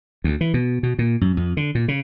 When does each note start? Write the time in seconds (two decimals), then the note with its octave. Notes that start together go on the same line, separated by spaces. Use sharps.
0.24 D2
0.41 E3
0.54 B2
0.83 B2
0.99 A#2
1.21 F#2
1.37 F2
1.57 D3
1.75 A#2
1.88 C#3